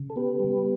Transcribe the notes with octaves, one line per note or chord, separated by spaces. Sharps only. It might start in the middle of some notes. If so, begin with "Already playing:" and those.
Already playing: C#3
A4
B3 G4 B4
G3